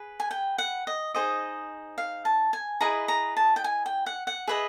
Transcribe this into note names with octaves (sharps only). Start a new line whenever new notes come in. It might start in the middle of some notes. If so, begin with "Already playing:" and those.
Already playing: G#4 B4
G#5
G5
F#5
D#5
D#4 G#4 C5 D#5
F5
A5
G#5
E4 G#4 B4 D#5 A#5
A#5
A5
G5
G#5
G5
F#5
F#5
G#4 B4 D#5 E5